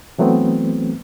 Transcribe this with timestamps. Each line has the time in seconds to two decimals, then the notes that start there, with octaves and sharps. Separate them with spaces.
0.18 E3 F#3 A3 B3 C4